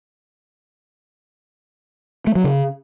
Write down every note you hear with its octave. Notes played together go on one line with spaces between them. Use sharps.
A3
F#3
C#3